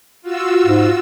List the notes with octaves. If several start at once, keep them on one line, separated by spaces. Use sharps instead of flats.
F4 F#4 E6
G#2